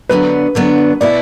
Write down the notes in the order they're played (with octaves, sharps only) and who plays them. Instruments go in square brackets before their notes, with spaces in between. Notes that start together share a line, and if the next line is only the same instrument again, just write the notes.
[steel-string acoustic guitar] D3 F#3 B3 D4 [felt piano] B4
[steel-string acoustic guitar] D3 F#3 B3 D4
[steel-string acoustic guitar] B2 B3 E4 [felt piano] D5